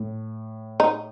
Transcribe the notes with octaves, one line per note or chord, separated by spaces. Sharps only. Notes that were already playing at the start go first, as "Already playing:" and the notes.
Already playing: A2
D#4